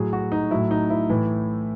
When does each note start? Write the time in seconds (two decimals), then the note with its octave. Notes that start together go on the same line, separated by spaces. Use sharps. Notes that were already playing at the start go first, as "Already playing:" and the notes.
Already playing: A2 F#3 G#4
0.13 F#4
0.32 D#4
0.51 A2 F#3 E4
0.71 D#4
0.90 E4
1.10 A2 E3